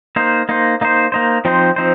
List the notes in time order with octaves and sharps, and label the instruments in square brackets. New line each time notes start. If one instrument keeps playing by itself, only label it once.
[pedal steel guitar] A#3 D#4 C5
A#3 D#4 C5
A#3 D#4 C5
A#3 D#4 C5
F3 C4 D#4 C5
F3 C4 D#4 C5